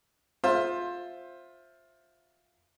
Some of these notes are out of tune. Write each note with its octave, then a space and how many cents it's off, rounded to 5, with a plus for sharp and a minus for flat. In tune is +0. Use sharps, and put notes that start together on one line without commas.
F4 +15 C5 +15 E5 +5